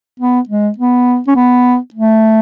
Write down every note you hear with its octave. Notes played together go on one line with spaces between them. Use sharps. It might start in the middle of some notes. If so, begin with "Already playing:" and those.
B3
G#3
B3
C#4
B3
A3